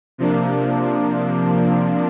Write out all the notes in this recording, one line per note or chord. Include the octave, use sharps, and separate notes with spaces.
C3 F3 A#3 D4